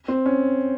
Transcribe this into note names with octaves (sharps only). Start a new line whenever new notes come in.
C4
C#4